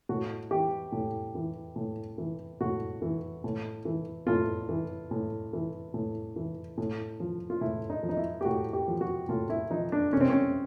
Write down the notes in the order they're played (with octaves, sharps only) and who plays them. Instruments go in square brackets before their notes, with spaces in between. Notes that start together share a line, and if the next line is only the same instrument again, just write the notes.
[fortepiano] A2 F#4
E3 G4
A2
E3
A2
E3
A2 F#4
E3
A2
E3
A2 F4
E3
A2
E3
A2
E3
A2
F3
F4
A2 E4
D#4
F3
D#4
E4
G4
A2 F#4
G4
F3
F#4
A2 F4
E4
F3 D#4
D4
C3 C#4
C4
C#4